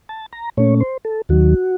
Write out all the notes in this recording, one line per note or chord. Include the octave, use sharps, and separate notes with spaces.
A5
A#5
A#2 A3 C#4 C#5
C5
A4
D#2 D#3 F#3 F#4